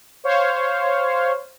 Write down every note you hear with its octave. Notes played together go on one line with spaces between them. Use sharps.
C5 C#5 F5